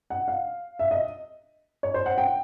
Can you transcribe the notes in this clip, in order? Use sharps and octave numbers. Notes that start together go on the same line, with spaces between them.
F#5
F5
E5
D#5
C#5
C5
F#5
G5